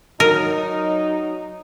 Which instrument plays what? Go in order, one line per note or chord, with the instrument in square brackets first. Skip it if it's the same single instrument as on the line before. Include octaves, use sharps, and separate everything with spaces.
[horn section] F#3 D#4 [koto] A#4